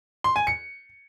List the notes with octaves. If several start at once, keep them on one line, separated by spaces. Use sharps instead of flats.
C6
G#5
C#7